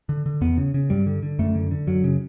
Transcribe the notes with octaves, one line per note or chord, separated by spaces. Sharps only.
D3
D3
E2 B3
C#3
C#3
G2 G3
D3
D3
F#2 A3
D3
D3
F#2 F#3
C#3